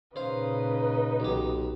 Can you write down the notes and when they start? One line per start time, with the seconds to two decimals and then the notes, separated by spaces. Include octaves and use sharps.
0.16 A#2 C#3 D#4 B4 C5 F5
1.20 B1 G4